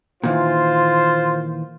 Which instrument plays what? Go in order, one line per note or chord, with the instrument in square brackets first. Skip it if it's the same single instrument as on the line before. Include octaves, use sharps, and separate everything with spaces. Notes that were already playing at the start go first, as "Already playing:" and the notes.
[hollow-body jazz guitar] A#2 D#3 E3 [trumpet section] F4 C5